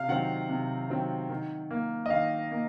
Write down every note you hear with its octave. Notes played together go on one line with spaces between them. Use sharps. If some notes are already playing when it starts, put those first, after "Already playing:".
Already playing: C3 F5
D#3 F#3 C4 F#5
C3
D#3 F#3 C4
D#3
A#3
D#5
D#3 F5
A#3